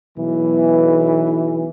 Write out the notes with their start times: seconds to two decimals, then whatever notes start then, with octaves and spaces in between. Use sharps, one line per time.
0.18 B1 E3